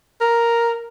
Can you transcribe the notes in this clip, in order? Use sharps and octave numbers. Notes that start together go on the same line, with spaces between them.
A#4